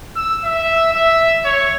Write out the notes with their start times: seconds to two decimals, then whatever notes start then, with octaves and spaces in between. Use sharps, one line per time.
0.16 E6
0.45 E5
0.93 E5
1.45 C#5